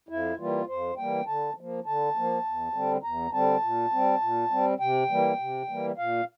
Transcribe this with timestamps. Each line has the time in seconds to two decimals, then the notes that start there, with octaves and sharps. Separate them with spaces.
0.09 F2 E4
0.38 E3 G3 A#3 F4
0.68 F2 C5
0.97 E3 G3 A#3 G5
1.27 D3 A5
1.56 F3 A#3
1.86 D3 A5
2.16 F3 A#3
2.45 E2
2.74 D3 G3 C4
3.03 E2 A#5
3.33 D3 G3 C4 A5
3.62 A#2
3.92 G3 C4
4.21 A#2
4.51 G3 C4
4.80 C3 G5
5.10 E3 G3 A#3
5.39 C3
5.69 E3 G3 A#3
5.98 A#2 F5